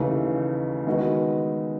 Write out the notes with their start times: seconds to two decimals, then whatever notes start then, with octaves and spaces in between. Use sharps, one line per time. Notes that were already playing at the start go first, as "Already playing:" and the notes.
Already playing: D#2 C#3 E3 A3 D#4
0.87 D#3 G#3 B3 F#4